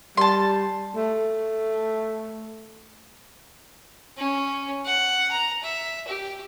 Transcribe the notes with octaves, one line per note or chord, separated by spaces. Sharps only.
G3 A5 C6
A3
C#4
F#5
A#5
E5
G4